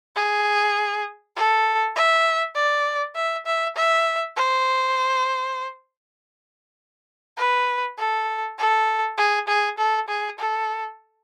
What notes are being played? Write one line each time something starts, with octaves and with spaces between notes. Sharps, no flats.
G#4
A4
E5
D5
E5
E5
E5
C5
B4
A4
A4
G#4
G#4
A4
G#4
A4